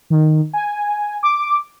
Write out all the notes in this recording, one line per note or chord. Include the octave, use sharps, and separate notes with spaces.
D#3
G#5
D6